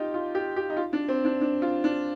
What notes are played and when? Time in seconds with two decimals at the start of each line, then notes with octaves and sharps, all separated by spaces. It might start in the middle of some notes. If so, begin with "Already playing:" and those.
Already playing: D#4 F4 G4
0.14 F4
0.35 G4
0.56 G4
0.70 D#4
0.77 F4
0.93 D4
1.09 C4
1.25 D4
1.41 D4
1.62 F4
1.84 D4